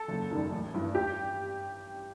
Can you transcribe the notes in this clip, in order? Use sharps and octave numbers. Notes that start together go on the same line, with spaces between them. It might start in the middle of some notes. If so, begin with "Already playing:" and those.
Already playing: A4
F#1
F#2 D#3 G3
A1
G2 E3
G4